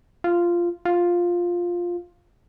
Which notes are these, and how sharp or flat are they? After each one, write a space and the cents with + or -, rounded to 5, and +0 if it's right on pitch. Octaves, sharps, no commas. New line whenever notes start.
F4 -10
F4 +5